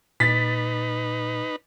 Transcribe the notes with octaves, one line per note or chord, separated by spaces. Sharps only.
A#2 D#4 B4 A6 B6